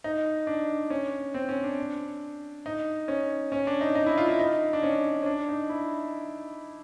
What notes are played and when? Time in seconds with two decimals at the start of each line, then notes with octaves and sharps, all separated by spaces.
0.04 D#4
0.47 D4
0.90 C#4
1.34 C4
1.49 C#4
1.63 D4
2.66 D#4
3.08 C#4
3.52 C#4
3.67 D4
3.81 D#4
3.95 D#4
4.06 E4
4.17 F4
4.28 E4
4.39 D#4
4.73 D4
4.83 C#4
5.23 C#4
5.26 D4
5.49 D#4
5.70 E4